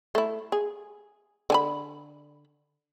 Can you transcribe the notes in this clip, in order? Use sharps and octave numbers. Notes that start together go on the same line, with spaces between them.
A3 E4
G#4
D3 G#5 B5